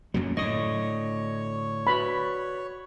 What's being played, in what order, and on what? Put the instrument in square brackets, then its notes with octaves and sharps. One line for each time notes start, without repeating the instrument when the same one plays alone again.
[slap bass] F#2 A#2 F#3
[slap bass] A2 D3 [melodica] C#5 [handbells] D#5 D#6
[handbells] F#4 B4 D5 [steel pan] B5